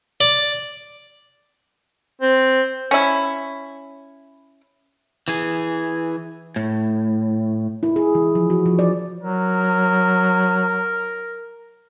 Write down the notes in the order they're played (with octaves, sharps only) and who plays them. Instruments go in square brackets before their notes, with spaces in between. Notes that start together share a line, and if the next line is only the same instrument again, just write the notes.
[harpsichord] D5
[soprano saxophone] C4
[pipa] C#4 E4
[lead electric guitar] E3 G#4
A2
[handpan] E4
G#4
E3
F3
F#4
F3
D5
[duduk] F#3 [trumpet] A#4